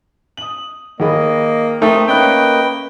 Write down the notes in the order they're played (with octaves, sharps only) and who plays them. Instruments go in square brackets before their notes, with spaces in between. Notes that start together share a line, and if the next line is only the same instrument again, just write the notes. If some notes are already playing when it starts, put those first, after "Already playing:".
[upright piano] D#6 F#7
[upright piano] D#2 G#4 B5 [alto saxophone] A#3 [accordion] D#5
[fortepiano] A3 [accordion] C4 [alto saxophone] D#4 [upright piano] A#4 D#6
[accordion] A#3 B4 D#5 [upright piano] C#4 F#6 [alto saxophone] G5